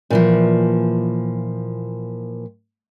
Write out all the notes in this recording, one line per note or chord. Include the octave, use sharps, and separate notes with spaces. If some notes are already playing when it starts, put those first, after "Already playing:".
A#2 E3 F3